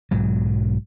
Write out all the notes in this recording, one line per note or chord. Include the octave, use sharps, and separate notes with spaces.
B1 G#2 F#3